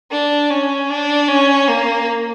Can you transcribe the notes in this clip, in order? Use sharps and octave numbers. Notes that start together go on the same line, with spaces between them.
D4
C#4
D4
C#4
A#3